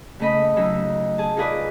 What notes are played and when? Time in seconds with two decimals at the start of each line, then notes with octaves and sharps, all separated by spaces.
0.20 C#3 A3 D#5 B5
0.56 C#3 F#3 D#4 E6
1.18 G#4 A5
1.37 D#4 F4 G#4 B4 D5